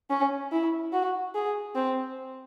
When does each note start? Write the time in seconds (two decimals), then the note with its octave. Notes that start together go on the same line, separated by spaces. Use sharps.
0.10 C#4
0.52 E4
0.93 F#4
1.35 G#4
1.75 C4